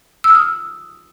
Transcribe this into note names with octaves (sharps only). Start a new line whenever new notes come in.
E6
F6
D#6